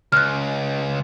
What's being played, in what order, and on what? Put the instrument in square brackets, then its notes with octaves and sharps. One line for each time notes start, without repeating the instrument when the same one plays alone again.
[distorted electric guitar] C#2 [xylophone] F6 F#6